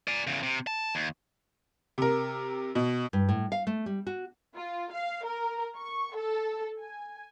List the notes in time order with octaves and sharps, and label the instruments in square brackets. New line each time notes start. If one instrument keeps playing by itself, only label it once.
[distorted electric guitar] D5 G#5
E2 C#3
C3
A5
D#2
[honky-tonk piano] C3 A#4
B2
[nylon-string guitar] G2
A2
F5
A3
G3
F#4
[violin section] F4
F5
A#4
C#6
A4
G#5